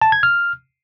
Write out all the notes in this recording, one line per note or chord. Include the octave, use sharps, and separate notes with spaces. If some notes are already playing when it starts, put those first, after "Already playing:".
A5
G#6
F6